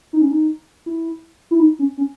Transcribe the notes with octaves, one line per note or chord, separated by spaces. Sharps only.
D#4
C#4
D#4
E4
E4
D#4
C#4
C#4